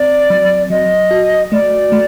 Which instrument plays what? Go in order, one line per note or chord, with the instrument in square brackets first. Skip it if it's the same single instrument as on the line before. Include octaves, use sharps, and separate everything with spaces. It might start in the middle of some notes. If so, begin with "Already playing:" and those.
Already playing: [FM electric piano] C4 [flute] D5
[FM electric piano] F#3
[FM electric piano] F#3 [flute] D#5
[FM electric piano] F#4
[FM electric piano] A3 [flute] D5
[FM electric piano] A3